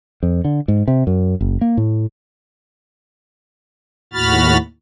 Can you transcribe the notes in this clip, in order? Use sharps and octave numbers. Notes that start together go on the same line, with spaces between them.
F2
D3
G#2
C3
F#2
F#1
A#3
A2
D#2 A2 F#4 B5 F6 A6